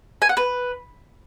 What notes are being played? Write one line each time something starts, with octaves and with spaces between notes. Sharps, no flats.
G#5
F#5
B4